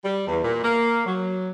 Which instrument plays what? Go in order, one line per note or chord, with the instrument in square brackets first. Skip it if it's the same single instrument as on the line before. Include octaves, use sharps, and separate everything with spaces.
[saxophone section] G3
E2
A#2
A#3
F#3